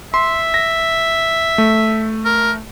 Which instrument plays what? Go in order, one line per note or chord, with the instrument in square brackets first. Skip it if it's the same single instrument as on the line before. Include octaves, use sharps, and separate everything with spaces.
[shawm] E5 [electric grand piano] C6
[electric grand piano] A#6
A3
[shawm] A#4